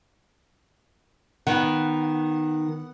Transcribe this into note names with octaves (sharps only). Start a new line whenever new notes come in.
D#3 B3 F#5